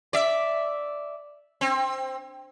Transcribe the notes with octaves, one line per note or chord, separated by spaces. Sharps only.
D5 E5
C4